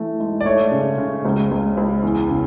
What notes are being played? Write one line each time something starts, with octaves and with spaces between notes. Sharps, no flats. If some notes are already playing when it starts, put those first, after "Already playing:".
Already playing: E3 A3
G#2
D5
A3 C#5
C#3
C#3
C#2
C#2
C#2
E2
C#3